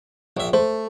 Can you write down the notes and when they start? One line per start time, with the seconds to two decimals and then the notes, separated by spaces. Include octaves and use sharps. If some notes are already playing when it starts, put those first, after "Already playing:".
0.37 A#1 E5
0.53 A3 C5